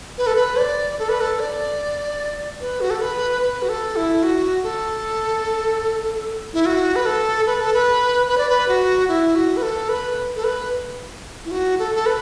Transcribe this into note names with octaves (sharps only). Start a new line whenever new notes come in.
B4
A4
B4
D5
A4
B4
A4
D5
B4
F#4
A4
B4
B4
F#4
A4
E4
F#4
A4
E4
F#4
B4
A4
B4
A4
B4
B4
D5
B4
F#4
E4
F#4
B4
A4
B4
A4
B4
E4
F#4
A4
A4
B4